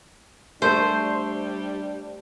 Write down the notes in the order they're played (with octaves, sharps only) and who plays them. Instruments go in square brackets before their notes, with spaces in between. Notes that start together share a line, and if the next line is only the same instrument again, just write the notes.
[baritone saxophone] G3 [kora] A3 [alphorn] D4 [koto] C5